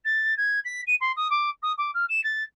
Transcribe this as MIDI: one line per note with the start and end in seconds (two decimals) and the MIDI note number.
0.05 0.34 93
0.37 0.59 92
0.64 0.81 95
0.87 0.95 99
1.00 1.12 84
1.16 1.28 87
1.30 1.50 86
1.62 1.72 87
1.78 1.91 86
1.94 2.05 89
2.09 2.23 100
2.23 2.43 93